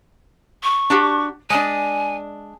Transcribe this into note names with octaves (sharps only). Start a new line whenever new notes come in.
C#6
D4 F#4 G4
G#3 D4 G#5